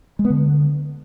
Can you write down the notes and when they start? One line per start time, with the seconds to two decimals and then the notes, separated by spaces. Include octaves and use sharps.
0.19 G#3
0.25 B3
0.30 D3